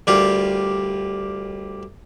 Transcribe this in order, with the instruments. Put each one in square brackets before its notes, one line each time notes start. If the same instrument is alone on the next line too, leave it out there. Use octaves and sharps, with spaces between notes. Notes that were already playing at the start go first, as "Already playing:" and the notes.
[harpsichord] D2 G3 F4 G4 A#4